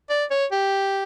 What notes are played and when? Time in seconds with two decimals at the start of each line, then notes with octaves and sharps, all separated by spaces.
0.10 D5
0.30 C#5
0.52 G4